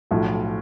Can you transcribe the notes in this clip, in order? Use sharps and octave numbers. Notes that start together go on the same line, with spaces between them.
B1 A2 F3